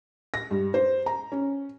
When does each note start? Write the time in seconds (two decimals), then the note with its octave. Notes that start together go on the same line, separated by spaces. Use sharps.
0.34 A#6
0.51 G2
0.74 C5
1.06 A#5
1.32 C#4